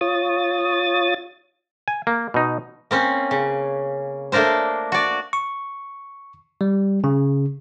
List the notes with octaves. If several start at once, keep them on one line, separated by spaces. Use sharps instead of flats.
F4 C#5 D#6 A6
G#5
A#3
B2 D#4
A#3 C4 C#4
C#3
A3 A#3 D4 A#4 C5
F#4 D5
C#6
G3
C#3